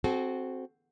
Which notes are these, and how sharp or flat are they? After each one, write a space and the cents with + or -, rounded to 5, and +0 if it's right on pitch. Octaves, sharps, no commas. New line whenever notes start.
C4 +0 F#4 +0 A4 -40